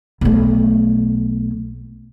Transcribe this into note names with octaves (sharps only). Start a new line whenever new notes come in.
B1 A3